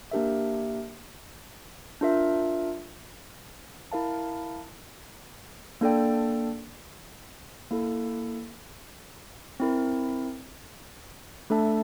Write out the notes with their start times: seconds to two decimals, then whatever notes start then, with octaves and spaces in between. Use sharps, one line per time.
0.11 A#3 D4 G4 A#4 E5
2.01 D4 F4 A#4 E5
3.92 E4 A#4 F5 A5
5.81 A#3 D4 A4 D5 G5
7.71 A#3 E4 A4
9.60 C4 E4 A#4
11.50 A3 D4 A4 E5 A5